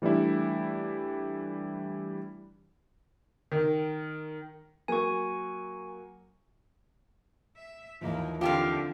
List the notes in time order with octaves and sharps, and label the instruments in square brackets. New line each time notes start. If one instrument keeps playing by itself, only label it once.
[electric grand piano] E3 G3 A3 D4 E4
[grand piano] D#3
[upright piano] F#3 A#3 [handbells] G#5 C#6
[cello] E5
[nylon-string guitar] D#2 E3 F3 [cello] A#3
[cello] D3 C4 [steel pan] F4 [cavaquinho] G4 E5 F5